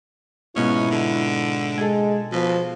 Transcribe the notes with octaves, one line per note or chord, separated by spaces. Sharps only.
G#2 B2 C#4 E4 F4
D3
G#3 A4 G#5
B2 F3